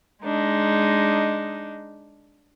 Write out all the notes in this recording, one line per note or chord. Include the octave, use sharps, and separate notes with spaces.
G#3 D4 D#4